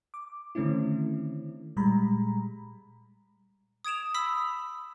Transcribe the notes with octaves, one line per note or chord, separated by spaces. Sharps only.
D6
D3 D#3 A3 C4 C#4 E4
A#2 G3 G#3 A#5 B5
D#6 G#6 D7 E7 F7
B5 D#6 E6 B6